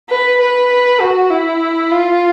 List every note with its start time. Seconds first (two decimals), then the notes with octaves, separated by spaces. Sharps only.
0.09 B4
0.40 B4
1.00 F#4
1.30 E4
1.91 F4